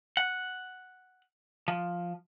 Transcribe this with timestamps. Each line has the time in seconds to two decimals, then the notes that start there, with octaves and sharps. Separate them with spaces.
0.17 F#5
1.68 F3